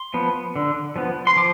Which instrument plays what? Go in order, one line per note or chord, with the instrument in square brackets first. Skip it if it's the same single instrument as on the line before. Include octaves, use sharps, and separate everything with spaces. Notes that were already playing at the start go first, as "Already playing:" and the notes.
Already playing: [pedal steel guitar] C6
F3 B3
D3
F3 B3
C6
F3 D6